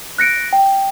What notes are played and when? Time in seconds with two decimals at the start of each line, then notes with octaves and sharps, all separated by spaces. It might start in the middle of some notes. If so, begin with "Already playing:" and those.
0.18 F#6 A#6 C#7 D7
0.53 G5